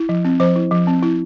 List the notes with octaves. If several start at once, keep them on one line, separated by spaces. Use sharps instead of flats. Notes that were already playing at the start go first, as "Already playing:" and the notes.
Already playing: E4
F3
C4
F3 C5
E4
F3
C4
E4